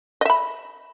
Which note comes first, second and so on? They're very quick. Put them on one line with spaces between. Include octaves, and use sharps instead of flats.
D#5 E5 B5